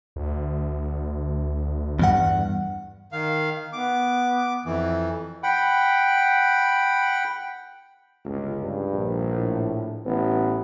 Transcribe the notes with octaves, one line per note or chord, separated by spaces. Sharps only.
D2
E2 G2 F#5
D#3 F5
B3 D6
F2 E3
F#5 G5 B5
G1 C#2
G2
A#1
A2
A1 B3